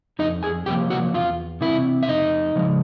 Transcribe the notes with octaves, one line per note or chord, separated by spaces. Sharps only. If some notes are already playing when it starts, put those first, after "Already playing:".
F2 D#4 D#5
G#4 G#5
C3 F3 A#3 G4 G5
F#4 F#5
E2 F4 F5
C3 E3 E4 E5
E5
F2 D#4 D#5
C#3 F3 G#3